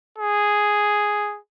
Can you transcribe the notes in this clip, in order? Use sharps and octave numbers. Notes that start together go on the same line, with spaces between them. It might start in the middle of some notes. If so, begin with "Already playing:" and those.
G#4